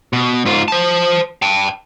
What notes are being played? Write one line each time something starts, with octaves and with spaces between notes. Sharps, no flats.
B2
G#2 F4
C5 A5
G5 A5